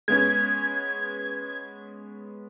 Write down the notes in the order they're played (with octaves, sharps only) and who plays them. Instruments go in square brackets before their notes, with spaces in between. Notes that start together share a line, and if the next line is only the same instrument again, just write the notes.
[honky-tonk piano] G#3 B3 C#4 [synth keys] G#6